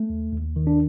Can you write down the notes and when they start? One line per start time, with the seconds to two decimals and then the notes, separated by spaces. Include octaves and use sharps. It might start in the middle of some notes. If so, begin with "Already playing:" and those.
Already playing: A3
0.10 D#2
0.33 D#2
0.56 D#3
0.67 D4